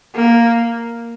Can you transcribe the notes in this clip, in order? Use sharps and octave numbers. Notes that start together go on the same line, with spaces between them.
A#3